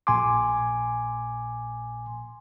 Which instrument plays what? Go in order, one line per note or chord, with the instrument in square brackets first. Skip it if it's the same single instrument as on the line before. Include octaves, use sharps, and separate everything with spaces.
[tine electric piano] A#1 A#2 G#5 C6 D6